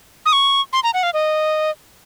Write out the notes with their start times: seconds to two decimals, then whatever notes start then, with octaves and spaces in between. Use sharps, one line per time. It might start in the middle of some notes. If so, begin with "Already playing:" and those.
0.26 D#6
0.33 C#6
0.73 C6
0.83 A#5
0.94 F#5
1.03 F5
1.14 D#5